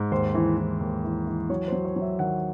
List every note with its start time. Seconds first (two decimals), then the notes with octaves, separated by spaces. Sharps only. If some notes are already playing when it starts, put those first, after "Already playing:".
Already playing: G#2
0.11 D#2 C5
0.35 E3
0.57 E3
0.81 D#2
1.04 E3
1.27 E3
1.49 F#3 C#5
1.68 F#3 C5
1.85 C#5
1.96 F#3
2.01 E5
2.19 D#3 F#5